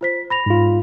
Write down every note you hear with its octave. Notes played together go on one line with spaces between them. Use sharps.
F4 C5 B6
B5 A#6 F7
G#2 F4